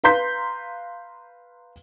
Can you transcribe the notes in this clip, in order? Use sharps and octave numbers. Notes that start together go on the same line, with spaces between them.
B4 F5 A#5 C6 G6 B6